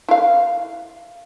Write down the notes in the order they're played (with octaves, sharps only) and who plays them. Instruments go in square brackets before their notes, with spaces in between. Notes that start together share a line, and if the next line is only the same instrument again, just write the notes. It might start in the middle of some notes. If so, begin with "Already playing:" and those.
[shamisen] E4 F5